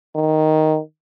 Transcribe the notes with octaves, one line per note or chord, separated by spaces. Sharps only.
D#3